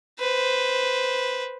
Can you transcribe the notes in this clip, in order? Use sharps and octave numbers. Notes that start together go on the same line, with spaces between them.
B4 C5